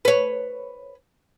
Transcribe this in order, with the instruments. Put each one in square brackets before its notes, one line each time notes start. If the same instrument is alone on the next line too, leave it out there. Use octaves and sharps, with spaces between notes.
[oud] B4 C#5